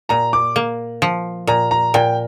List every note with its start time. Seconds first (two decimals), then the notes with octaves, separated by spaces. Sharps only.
0.09 A#2 A#5
0.33 D6
0.56 A#3
1.02 F3
1.47 A#2 A#5
1.71 A#5
1.94 A#2 G5